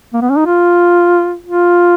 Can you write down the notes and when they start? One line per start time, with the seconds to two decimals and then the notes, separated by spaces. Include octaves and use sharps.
0.13 A#3
0.22 B3
0.30 C#4
0.37 D#4
0.46 F4
1.46 F4